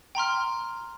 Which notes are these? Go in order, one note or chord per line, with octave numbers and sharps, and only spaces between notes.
G5 A#5 C6 F6